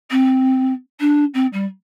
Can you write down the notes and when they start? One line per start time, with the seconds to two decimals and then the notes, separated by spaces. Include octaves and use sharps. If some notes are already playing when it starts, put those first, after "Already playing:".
0.11 C4
1.00 D4
1.34 C4
1.53 G3